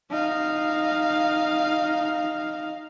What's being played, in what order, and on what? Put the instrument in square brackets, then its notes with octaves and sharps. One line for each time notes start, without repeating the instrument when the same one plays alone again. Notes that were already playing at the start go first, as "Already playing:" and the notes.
[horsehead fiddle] D#4 F5